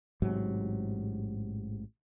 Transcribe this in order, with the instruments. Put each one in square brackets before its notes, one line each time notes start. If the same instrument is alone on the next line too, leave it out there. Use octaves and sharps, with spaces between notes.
[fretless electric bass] A1 G#2 C3 F#3